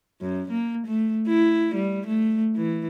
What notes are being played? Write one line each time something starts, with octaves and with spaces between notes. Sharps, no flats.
F#2
A#3
A3
E4
G3
A3
E3